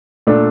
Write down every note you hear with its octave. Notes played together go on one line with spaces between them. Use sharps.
A#2 A3 D4 A4